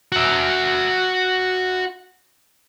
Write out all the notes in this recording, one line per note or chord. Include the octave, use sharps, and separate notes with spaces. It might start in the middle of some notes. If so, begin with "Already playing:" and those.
F#4 E5